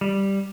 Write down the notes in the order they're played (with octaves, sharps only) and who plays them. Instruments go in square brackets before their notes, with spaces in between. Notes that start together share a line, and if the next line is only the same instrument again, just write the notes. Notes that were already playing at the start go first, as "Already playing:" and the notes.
[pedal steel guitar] G3